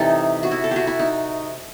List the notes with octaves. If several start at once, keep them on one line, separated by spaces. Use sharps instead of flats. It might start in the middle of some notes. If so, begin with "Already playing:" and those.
Already playing: C3 E3 G3 D#4 A4
F#4
E4
A4
F#4 G4
E4
D#4